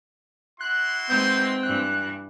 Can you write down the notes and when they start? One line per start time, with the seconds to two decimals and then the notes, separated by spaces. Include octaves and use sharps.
0.61 E4 F#4 C6 F#6
1.09 G#3 C4 D#4 B4 G6
1.63 G2 E3 F#6